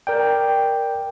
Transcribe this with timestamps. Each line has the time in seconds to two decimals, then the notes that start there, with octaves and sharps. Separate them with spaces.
0.07 A#4 D5 G5